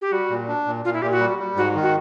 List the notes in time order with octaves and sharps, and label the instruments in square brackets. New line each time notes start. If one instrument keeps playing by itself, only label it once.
[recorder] G4
[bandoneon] G3 [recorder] F#4
[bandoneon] A#2
D4
A#2
[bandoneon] A#2 [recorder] F4
[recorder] E4
[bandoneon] A#2 [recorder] G4
[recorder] F#4
[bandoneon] G3
G3
[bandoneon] G#2 [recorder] F#4
[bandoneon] D#3
[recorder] F#4